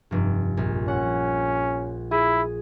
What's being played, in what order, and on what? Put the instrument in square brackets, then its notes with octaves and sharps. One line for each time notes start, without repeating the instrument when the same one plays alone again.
[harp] F1 G2
A#1
[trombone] C#4 [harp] F#5
[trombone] E4 [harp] G#4